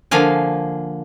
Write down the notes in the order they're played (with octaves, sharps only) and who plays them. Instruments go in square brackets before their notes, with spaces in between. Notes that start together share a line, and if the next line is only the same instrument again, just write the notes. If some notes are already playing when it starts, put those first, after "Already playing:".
[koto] D3 F3 A#3 F4 G#5